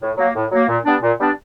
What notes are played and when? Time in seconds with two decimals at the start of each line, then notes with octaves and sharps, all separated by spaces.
0.01 A2
0.17 F#3 A#3
0.34 A2
0.51 F#3 A#3
0.68 A#2
0.84 G3 B3 D4
1.02 A#2
1.19 G3 B3 D4